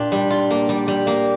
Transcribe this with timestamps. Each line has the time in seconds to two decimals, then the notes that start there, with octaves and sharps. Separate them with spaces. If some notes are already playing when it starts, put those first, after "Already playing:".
Already playing: A#2 D4 F4 G4
0.12 G3
0.30 F4
0.51 A#3
0.69 G3
0.88 G3
1.07 A#3